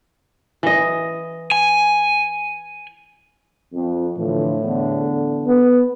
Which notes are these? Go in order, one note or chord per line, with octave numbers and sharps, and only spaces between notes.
E3 D#5
G#5
F2
A2 D3 E3 F3
E2 D3
B3